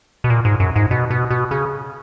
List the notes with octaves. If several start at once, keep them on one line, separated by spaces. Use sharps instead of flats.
B2
A#2
G#2
F#2
G#2
B2
B2
B2
C#3